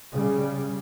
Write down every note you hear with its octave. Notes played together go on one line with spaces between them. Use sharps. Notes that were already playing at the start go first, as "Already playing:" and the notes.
C#3 G3